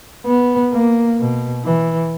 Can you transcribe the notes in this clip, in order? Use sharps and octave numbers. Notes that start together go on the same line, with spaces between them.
B3
A#3
B2
E3